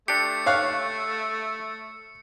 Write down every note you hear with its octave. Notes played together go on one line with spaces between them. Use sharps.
A3 D4 G4 C#7
C#5 F5 F#6